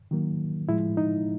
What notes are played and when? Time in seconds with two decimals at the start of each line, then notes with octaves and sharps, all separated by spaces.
0.11 D#3 F#3 A#3
0.68 A2 F3 G#3 E4
0.97 D#4